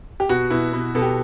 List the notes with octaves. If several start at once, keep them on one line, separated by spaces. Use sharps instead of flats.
G4
B2 F#4
B2 E4
B2
B2 A4
G4